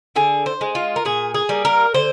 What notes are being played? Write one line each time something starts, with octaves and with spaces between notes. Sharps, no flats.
D3 G#4
C5
G#3
F4
A#4
A#2 G#4
G#4
G3 A#3
A#4
D3 C5